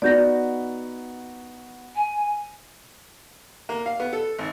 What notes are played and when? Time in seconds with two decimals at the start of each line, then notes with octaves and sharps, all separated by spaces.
0.02 B3 D#4 F#4 D5 G6 A#6
1.95 G#5
3.69 A#3
3.86 F5
4.00 B3
4.13 A4
4.39 G#1